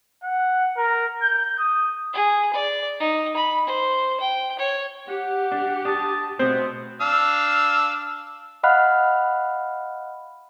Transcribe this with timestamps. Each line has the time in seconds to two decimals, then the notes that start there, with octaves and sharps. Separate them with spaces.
0.23 F#5
0.77 A#4
1.23 G6
1.59 D#6
2.14 G#4
2.53 D5
3.00 D#4
3.37 B5
3.67 C5
4.20 G5
4.59 C#5
5.08 G4 F#5
5.52 D4
5.85 D4 A5 D#6
6.39 B2 A3 B3 C4 C5
7.01 D4 F5 E6
8.63 D#5 F5 F#5 B5 F6 F#6